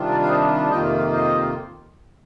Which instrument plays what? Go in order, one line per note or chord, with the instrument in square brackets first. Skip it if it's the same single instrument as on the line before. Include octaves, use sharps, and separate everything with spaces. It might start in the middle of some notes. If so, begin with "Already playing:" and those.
Already playing: [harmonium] C3 D#3 G3 D4 F4
A#4 D5
F5
C5 D#5
F2 C3 D#3 A#3 F4 D#5 G5
C5 D#5